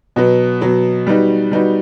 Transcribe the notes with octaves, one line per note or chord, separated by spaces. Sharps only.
B2 F#3 B3
B2 F#3 B3
G3 B3 D#4 F#4
G3 B3 D#4 F#4